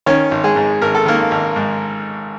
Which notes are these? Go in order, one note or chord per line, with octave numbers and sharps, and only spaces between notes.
D#3 C#4 C#5
G#1
G#3 G#4
G#2
G#1 A#4
A4
D#3 A#3 A#4
G#1
G#2